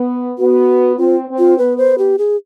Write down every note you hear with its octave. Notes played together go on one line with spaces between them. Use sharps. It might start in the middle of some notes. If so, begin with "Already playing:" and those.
Already playing: B3
B3 F#4
C4 F4
C4
F4
B3 B4
C5
G4
G#4